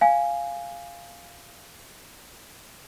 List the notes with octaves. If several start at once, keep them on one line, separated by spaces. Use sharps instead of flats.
F5 G#5